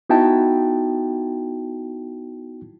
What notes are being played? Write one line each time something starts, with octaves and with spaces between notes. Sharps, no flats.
B3 D#4 E4 F#4 G5 A5